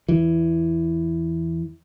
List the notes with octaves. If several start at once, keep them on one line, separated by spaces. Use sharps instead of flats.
E2 E3